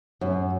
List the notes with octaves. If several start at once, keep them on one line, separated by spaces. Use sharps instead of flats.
F#2